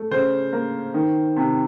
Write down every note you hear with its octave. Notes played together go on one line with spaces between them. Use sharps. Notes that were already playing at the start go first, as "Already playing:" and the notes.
Already playing: A3
C#3 C5
A#3
D#3
C3